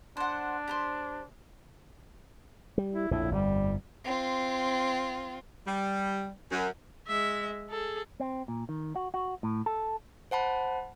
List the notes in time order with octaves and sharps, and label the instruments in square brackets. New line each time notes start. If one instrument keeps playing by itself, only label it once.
[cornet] D4 [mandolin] C5 F#5
[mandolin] G4 A#4 C5
[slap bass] G3
[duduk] E4
[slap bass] A#1 F2 A2 [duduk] E4
[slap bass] G1 F2 [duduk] G3
[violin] C4 F4
[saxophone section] G3
F#2
[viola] G#3 E5
G#4 A4
[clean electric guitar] C4
A#2
D#3
F#4
F#4
A2
A4
[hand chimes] C5 F#5 A5 B5